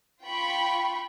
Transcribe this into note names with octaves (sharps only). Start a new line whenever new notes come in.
F4 G5 B5 C#6